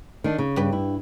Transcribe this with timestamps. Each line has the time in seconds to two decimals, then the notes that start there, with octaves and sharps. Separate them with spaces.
0.24 D#3 D4
0.38 C#3
0.56 G2 G4 B4
0.73 E4